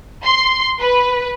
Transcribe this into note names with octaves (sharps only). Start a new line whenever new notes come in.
C6
B4